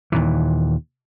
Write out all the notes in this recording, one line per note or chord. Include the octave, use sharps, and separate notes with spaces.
D#2 A#2 E3